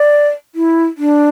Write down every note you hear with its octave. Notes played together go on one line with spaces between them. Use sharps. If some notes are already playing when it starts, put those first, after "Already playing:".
Already playing: D5
E4
D4